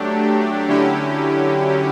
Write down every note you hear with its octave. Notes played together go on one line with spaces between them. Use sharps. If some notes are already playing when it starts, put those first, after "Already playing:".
Already playing: F#3 A3 D4 G4
D3 F#3 C#4 E4 G4